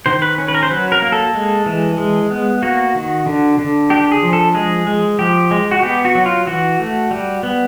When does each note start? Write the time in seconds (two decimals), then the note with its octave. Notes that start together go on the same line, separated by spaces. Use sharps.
0.06 D#3 C5
0.22 B4
0.38 C#4
0.48 B4
0.54 A#4
0.63 C5
0.71 F#3 B4
0.92 A#4
1.02 A#3
1.12 A4
1.34 G#3
1.66 E3
1.98 G#3
2.31 B3
2.62 A#3 F#4
2.95 D#3
3.26 D3
3.59 D3
3.90 D4 G4
4.12 G#4
4.23 F3
4.33 A4
4.54 G#3 G#4
4.87 G#3
5.19 F3 G4
5.51 G#3
5.71 F#4
5.82 B3 G4
6.05 F#4
6.15 F#3
6.26 F4
6.47 E3 F#4
6.79 A3
7.11 G3
7.43 B3